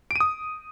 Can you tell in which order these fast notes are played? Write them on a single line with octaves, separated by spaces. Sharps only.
D7 D#7 D#6